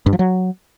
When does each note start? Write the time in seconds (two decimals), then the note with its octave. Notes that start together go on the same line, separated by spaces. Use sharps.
0.06 G2
0.13 F3
0.19 F#3